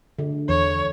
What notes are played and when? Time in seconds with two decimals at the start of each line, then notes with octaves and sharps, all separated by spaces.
0.19 D3
0.49 E2 C#5